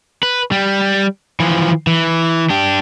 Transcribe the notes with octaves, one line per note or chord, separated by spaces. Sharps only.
B4
G3
E3 F3
E3
D4 G4